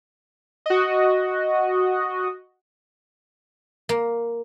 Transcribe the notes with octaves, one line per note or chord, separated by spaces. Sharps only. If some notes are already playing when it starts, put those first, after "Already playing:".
F#4 D#5
A#3